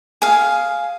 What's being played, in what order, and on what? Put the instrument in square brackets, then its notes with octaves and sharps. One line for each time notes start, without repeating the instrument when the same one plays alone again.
[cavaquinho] G#4 F5